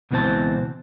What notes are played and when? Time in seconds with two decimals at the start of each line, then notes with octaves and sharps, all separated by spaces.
0.11 C#2 B2 E3 C4 C5 A5